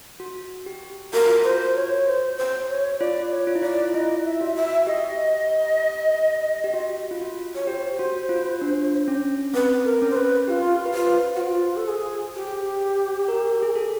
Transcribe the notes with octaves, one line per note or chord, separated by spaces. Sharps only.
F#4
G4
F#4 A#4
F4
F#4
C5
C#5
C5
C5
C#5
F4 D5
C#5
F4
E4
F4 D5
F4
E4 D#5
E5
F#4
E5
G4 D#5
G4
F#4
F4
F#4
C#5
G4 C5
F#4
F4
D4
C#4
C4 B4
A#4
C#4
C5
B4
F4 G4
B4
F4 C5
F#4
F4 C5
A4
G#4
G4
A#4
G#4
A4